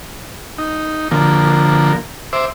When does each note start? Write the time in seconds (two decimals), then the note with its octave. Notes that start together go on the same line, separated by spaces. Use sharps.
0.58 D#4
1.11 D3 F3 A#3
2.33 C5 E5 D6